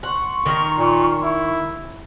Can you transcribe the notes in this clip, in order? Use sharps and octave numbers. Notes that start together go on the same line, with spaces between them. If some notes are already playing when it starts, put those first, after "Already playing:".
F#5 C6 C#6
D#3 A#4
A#2
E4